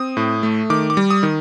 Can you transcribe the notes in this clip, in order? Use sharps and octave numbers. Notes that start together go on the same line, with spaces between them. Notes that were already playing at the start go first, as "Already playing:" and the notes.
Already playing: C4 D#6
A2
A3
D#3 D6
D6
G3
D#6
D#3